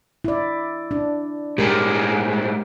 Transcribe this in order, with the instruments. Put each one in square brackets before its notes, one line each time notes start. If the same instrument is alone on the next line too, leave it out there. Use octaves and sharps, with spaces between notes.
[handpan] E4 D5
D4
[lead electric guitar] A2 G#3 [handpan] G4 A#4